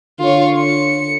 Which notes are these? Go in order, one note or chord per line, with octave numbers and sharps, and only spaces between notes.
D3 F4 C#5
C#7